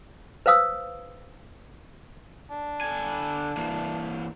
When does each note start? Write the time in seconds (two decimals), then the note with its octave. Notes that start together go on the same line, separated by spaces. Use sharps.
0.46 B4 C5 F5 D#6 E6
2.51 D4
2.81 D3 G#5
3.57 E3 A#3